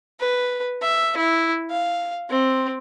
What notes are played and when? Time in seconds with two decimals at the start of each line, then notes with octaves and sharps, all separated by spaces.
0.20 B4
0.82 E5
1.17 E4
1.71 F5
2.30 C4